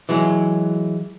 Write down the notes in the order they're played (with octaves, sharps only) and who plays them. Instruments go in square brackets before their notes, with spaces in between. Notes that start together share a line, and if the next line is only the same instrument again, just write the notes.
[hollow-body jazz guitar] E3 F#3 G#3